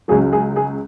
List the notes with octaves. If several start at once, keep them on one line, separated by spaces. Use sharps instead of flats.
C#2 C#3 F#3 G#4
G#4
G#4